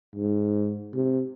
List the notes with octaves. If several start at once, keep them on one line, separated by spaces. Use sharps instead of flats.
G#2
C3